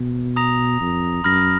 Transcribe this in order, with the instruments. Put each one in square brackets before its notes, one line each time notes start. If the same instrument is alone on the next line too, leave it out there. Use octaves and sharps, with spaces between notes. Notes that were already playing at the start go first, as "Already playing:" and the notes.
Already playing: [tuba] B2
[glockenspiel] A#5 D#6 A#6 F7
[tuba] F2
[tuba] F#2 [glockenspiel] B5 F6 A#6